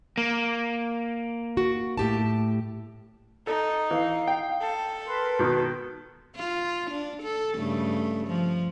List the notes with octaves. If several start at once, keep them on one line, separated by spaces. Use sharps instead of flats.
A#3
F#4
A2 G4 A5
D#4 A4
E3 F5
G5
A4
A#4 B4 C6
B2 D#3
F4
D4
A4
G2 C#3 A3
F3